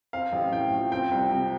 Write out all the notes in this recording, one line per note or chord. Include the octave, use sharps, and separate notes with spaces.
C4 F5
A1
A2 G5
F3
C4 G5
C2
C3